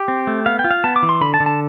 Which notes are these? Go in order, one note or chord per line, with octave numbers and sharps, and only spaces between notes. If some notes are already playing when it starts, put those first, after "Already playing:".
Already playing: G4
C4
A3
B3 F5
G5
F4
F5
B3 A5
D6
E3
C6
D3 B5
A5
D3
A5